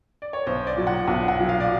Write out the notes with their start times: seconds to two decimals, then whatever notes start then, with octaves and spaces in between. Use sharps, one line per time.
0.22 D5
0.33 C#5
0.47 B1 C5
0.67 D5
0.77 A#2 F#3
0.87 F#5
1.07 B1 F#5
1.28 F#5
1.39 A#2 F#3
1.49 F5
1.60 D5